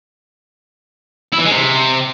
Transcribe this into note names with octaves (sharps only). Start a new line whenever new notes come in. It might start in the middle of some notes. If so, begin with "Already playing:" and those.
E4
E3
G#3
C3